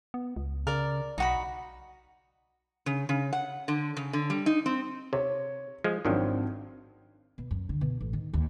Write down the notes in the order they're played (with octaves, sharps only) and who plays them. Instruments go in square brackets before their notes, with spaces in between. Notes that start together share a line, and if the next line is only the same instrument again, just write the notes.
[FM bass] B3
C#2
[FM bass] C#3 [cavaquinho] A#4 D5
[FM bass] B1 [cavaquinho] D#4 F#4 B5
[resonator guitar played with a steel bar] C#3
C#3
F#5
D3
C#3
D3
G3
D#4
C4
[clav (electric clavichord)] C3 [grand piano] C#5
[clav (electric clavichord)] F3 G#3
[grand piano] G#1 C4 D4 [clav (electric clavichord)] D#3 F3 F#3
[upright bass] B2
F#2
D3
B2
A1
D#3
D#2